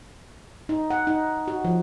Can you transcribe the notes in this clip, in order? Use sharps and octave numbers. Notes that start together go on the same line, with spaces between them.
D#4
F#5
D#4
F#4
F3